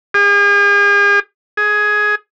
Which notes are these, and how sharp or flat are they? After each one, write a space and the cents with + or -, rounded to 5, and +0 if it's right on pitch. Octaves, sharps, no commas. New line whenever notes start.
G#4 -45
G#4 +10